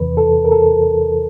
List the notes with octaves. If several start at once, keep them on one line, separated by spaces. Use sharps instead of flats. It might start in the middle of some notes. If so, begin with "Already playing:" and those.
Already playing: E2 C3 E3 B4
A4
A#4
A4